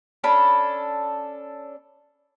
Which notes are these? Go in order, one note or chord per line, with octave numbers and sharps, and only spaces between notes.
C#4 D4 A4 B5